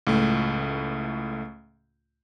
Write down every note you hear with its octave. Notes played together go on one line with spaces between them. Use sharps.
C#2 A2 A3